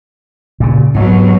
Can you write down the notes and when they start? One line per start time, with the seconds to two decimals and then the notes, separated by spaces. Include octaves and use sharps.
0.60 A#2 C#3
0.95 G#2 B2 F#3